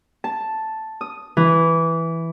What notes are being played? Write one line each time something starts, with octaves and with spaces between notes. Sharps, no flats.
A5
D#6
E3